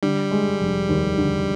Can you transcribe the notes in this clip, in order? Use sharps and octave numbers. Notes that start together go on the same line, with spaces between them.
D3 G3
G#3
F1
D#2
D3